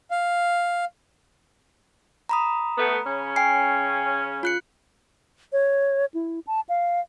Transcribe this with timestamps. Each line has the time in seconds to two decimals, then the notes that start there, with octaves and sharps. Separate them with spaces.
0.11 F5
2.29 A#5 B5 D#6
2.78 A3 B3
3.06 C#3 C#4
3.36 G5 G#5 C7
4.43 F4 F#6 C#7
5.53 C#5
6.14 E4
6.47 A5
6.69 F5